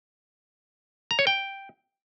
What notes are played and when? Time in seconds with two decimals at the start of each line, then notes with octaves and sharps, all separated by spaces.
1.11 A#5
1.19 C#5
1.27 G5